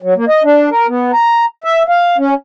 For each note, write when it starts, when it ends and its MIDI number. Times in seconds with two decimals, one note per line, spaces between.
0.02 0.14 54
0.16 0.25 58
0.29 0.43 75
0.44 0.69 62
0.71 0.87 70
0.88 1.12 59
1.13 1.45 82
1.64 1.83 76
1.89 2.17 77
2.18 2.34 61